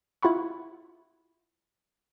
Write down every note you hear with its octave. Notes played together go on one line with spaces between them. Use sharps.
E4 F4 F#5 B5 C#6